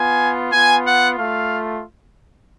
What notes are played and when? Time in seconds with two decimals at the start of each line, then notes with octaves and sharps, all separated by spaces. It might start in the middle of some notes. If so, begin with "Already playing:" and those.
Already playing: B3 F4 G#5
0.52 B3 F4 G#5
0.85 F#5
1.17 A3 F4 F5